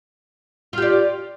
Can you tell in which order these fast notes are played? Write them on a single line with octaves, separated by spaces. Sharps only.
F4 G4 D5